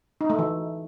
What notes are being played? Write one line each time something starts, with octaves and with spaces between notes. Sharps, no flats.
D#4
A3
E3